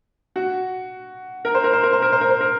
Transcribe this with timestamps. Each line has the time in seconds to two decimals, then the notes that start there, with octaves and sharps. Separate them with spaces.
0.36 F#4
1.45 A#4
1.54 C5
1.64 A#4
1.73 C5
1.83 A#4
1.92 C5
2.02 A#4
2.12 C5
2.21 A#4
2.30 C5
2.41 A#4